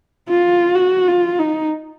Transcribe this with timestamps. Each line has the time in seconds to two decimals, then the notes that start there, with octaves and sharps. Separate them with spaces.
0.29 F4
0.75 F#4
1.07 F4
1.39 D#4